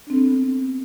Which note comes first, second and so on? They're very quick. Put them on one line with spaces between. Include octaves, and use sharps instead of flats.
D4 C4 A4 B3